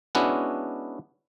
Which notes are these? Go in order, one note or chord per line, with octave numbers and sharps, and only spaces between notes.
G#3 B3 C#4 D4 E4 F#4